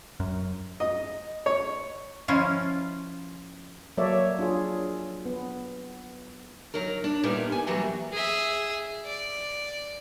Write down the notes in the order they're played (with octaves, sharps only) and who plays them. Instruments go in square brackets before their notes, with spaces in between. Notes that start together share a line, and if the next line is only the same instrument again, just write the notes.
[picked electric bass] F#2
[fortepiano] D#5
C#5
[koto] F3 C#4 E4 F4
[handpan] F#3 A#3 A4 C#5 D5 E5
D4 F4 G#4
B3
[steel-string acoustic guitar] F#3 D#4 A#4
D4
A#2 G3 B3 D#4 E4 A#4
B3 G#5
E3 F#3 G3 A#3 E4 F#4
[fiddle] G#4 E5
D5